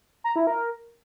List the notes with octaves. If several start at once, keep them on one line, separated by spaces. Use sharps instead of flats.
A#5
E4
A#4